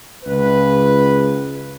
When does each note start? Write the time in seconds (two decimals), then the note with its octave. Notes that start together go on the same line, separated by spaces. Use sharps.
0.24 C#2 B4